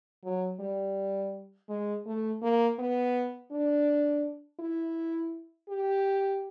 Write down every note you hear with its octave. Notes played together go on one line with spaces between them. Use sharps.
F#3
G3
G#3
A3
A#3
B3
D4
E4
G4